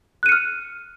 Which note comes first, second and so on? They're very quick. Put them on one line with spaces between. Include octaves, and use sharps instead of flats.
F#6 D#7 C#7 F6